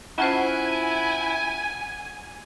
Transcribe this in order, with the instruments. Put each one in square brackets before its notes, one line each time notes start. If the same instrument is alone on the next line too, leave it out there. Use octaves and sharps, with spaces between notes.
[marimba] C#4 F4 C5 [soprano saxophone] E4 [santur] F#5 A5 [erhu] G#5